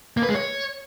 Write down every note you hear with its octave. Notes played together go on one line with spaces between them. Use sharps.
A#3
B4
G#3
C#5